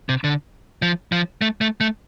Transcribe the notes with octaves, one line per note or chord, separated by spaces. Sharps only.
C3
D3
F3
F3
A3
A3
A3